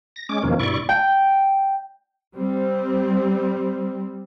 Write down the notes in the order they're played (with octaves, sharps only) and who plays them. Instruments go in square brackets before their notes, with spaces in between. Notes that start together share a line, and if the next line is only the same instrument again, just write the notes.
[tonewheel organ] A#6
G#3 C#4 D6
E2 B2 D#3 F3 A#3 C#4
G2 B2 E4 D5 C#6
[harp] G5
[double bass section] G3 C4